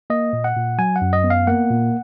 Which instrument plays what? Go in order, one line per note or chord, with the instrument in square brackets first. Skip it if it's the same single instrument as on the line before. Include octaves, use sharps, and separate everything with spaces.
[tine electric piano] A#3 D#5
A#2
F#5
A#2
F#3 G#5
F#5
F#2
D#5
B3
F5
A#3 F#5
A#2